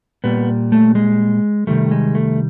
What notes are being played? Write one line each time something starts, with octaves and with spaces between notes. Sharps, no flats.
A#2 G3 B3
A3
G#3
C3 D#3 G3 A3
G#3
A3